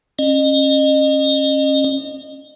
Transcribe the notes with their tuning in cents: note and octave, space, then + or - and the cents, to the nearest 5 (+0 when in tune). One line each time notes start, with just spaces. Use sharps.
C#4 -30 D#5 -30